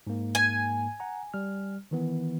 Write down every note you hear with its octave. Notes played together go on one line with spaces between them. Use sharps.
G#2 A#3
G#5
F#5 A#5
G3 F6
D#3 E3 B3